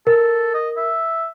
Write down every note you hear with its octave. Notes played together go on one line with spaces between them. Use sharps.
A4 A#4
D#5
E5